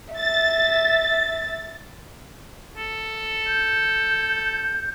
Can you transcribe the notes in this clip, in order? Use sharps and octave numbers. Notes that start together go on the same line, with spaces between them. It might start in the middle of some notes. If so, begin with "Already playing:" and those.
E5 A6
A4
G6